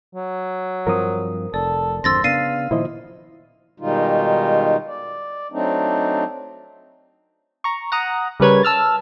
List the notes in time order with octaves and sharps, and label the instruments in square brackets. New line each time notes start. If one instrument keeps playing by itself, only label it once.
[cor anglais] F#3
[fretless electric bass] G2 F3 C4 [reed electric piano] A#4 D#6
[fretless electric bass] F1 [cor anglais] A4 [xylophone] D5
[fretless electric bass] G#1 F2 D3 [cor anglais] C5 [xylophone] E6 A6 A#6
[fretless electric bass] C#3 B3 D4 [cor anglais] F5 [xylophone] A6 C7 D#7
[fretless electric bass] A#2 D#3 F3 [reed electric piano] E4 C5 D#5
[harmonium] B2 D#3 G3 G#3 D#4 F4
D5
F#3 A3 C4 D4 D#4
[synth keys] A#5 C#6
F#5 A#5 D#6
C#3 G3 A#4 B4 C#5 G#6
A5 E6 F6 A6